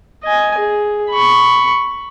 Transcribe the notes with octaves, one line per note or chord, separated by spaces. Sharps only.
D#5 G#5
G#4
B5 C#6